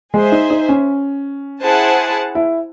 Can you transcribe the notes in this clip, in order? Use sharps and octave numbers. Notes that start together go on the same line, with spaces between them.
G#3 G#4 C5 E5
D#4
D#4
C#4
E4 G#4 C5 F#5 A5
E4